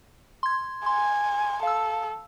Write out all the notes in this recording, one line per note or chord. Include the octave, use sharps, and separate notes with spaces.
C6 G#6
G#5 C6
A4 F5 E6